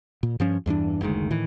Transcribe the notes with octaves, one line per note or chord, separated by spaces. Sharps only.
A#2
G2 F3 C#4
E2 G2 E3 D4
F#1 D2 D#3 G#3
A2 D#3 E3